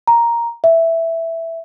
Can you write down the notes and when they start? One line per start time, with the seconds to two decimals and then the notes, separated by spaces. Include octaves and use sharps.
0.07 A#5
0.64 E5